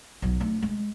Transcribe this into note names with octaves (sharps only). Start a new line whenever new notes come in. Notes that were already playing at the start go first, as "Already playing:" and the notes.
B1 F#3
A3 D4
G#3